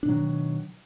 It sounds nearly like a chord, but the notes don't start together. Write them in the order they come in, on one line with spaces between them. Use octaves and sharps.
D4 B2 F#3 D#3